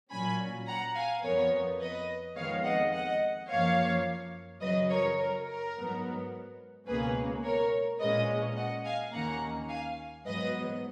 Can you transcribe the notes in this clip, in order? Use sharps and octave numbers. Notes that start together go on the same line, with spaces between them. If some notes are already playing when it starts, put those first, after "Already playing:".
A#2 F#3 C#4 G#5 B5
F#5 A#5
F5 G#5
F2 F3 B3 A#4 C#5
B4 D#5
F2 D#3 G#3 B3 C#5 F5
D#5 F#5
D#5 F#5
F#2 F3 A#3 C#5 F5
F#2 C#3 F#3 B4 D#5
A#4 C#5
A#4
A#4
G#2 F#3 B3
C#2 B2 A#3 C#4 G#4 B4
A#4 C#5
A#2 G#3 C#4 B4 D#5
D#5 F#5
F5 G#5
D#2 D#3 A#3 C#4 F#5 A#5
F5 G#5
G#2 F#3 B3 B4 D#5